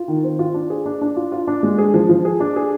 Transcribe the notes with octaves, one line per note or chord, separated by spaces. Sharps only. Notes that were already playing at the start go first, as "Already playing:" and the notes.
Already playing: F4
D#3
C4
F4
D4
G#4
D4
D4
F4
F4
D4
G#3
G#4
F3
F3
G#4
D4
G#4